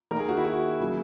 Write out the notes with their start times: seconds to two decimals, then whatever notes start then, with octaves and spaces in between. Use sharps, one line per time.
0.11 D#3 A#3 A#4
0.19 G#4
0.29 F#4
0.37 E4
0.45 F#4
0.80 C#3 F#3 A#3